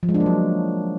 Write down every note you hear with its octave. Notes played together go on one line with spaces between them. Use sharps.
F3
G#3
D4
A#3
F#3